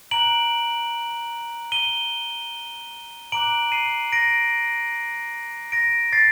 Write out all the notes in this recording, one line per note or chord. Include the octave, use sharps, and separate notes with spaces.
A#5 F#6 D7 F#7
D#7 G7
A#5 D6 F#6 D7 F#7
C7 D#7
A#6 D7
A#6 D7
A6 C7